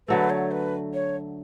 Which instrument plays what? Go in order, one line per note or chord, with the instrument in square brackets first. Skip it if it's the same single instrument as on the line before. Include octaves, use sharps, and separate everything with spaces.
[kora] D3 F#3 A3 [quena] B4
[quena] C#5
B4
C#5